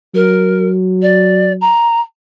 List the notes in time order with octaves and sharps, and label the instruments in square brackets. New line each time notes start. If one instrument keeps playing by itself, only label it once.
[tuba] F#3 [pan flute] A#4
[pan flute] D5
A#5